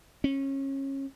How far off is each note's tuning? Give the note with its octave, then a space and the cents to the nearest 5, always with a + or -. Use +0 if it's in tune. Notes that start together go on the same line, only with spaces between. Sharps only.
C#4 -25